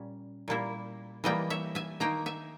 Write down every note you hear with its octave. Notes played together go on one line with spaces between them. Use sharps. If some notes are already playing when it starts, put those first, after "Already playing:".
Already playing: A#2 G3 C#4
A#2 G3 A#3 E4
E3 G3 A#3 D#5 G5
C#5 E5
E5 G#5
D#3 A#3 D#4 G5 A#5
E5 G#5